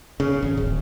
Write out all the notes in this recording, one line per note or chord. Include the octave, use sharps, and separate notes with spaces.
C#3
G#1
D1